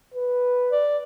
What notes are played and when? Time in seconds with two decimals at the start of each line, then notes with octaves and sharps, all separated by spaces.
0.14 B4
0.72 D5